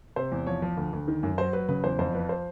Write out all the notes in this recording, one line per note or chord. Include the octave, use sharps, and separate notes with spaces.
C3 C5
E2
F3 C#5
F3
D2
D2
D#3
F#2
F#3 C5
F#3 B4
C#3 B4
E2 C5
F2 C5
F3 B4
C5